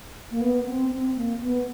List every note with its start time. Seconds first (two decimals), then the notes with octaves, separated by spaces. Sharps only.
0.31 A#3
0.41 B3
0.66 C4
0.91 C4
1.16 A#3
1.41 B3